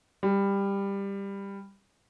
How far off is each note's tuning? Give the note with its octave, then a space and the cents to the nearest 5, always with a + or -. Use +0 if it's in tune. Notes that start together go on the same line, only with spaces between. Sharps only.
G3 +15